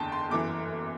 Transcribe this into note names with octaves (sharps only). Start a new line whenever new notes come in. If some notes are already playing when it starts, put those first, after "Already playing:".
Already playing: F#1 E2 D3 G5 A5
C6
G1 F#2 E3 D6